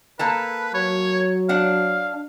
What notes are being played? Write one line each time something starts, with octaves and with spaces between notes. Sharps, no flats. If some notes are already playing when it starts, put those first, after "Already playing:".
A#3 A4 B4 A5
F#3 C#5
D4 F5 F#5